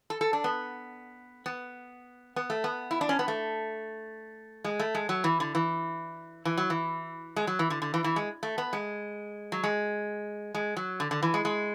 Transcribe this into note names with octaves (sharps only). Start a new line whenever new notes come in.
A4
A4
D4
B3
B3
B3
A3
B3
E4
D4
C#4
B3
A3
G#3
A3
G#3
F#3
E3
D3
E3
E3
F#3
E3
G#3
F#3
E3
D3
D3
E3
E3
G#3
A3
B3
G#3
F#3
G#3
G#3
F#3
D3
D3
E3
G#3
G#3